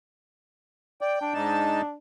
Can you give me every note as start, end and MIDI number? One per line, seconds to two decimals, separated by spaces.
1.01 1.17 74
1.01 1.33 79
1.21 1.94 62
1.34 1.82 44
1.34 1.82 63
1.34 1.82 81